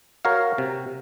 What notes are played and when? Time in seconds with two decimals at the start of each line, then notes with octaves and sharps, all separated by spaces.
0.25 F#4 A#4 C#5 F5
0.58 C3